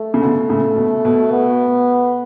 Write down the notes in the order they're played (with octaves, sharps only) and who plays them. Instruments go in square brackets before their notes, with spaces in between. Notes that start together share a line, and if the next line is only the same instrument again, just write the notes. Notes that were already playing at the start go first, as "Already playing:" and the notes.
Already playing: [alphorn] A3
[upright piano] C#3
B2 D3
A2 C#3
B2
B2
[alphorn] B3